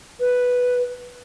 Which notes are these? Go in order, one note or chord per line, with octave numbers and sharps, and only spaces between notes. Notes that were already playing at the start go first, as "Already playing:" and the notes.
B4